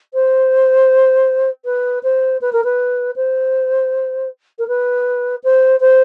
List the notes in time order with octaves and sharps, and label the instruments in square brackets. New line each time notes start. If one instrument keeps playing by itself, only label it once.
[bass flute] C5
B4
C5
B4
A#4
B4
C5
A#4
B4
C5
C5